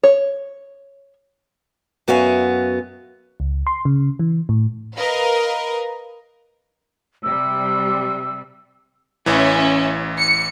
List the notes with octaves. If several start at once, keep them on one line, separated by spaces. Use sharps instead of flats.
C#5
F#2 B3 F#4 E5 F5 G#5
C#2
C6
C#3
E3
A2
A#4 B4 D#5 F5
C3 G3 E6
A1 E3 C#4 E5
C#7